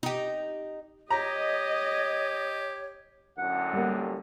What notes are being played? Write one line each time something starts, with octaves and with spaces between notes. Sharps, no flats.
D#4 G4
G4 C#5 D#5 A#5
F#2 A2 D3 F#5
G3 A#3